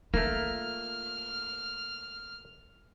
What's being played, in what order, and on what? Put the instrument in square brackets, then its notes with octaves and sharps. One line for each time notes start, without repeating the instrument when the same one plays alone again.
[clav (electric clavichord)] A3 A#3 [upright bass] F4 [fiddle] F6